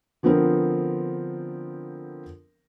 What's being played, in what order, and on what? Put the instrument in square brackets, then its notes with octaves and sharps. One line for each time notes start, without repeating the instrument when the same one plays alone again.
[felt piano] D3 F3 B3 C4 A#4